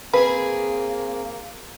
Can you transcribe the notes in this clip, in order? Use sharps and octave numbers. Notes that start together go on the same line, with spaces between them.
A#3 C4 G#4 B4